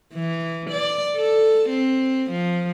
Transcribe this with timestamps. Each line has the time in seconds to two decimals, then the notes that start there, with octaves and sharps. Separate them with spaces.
0.14 E3
0.70 D5
1.16 A4
1.69 C4
2.30 F3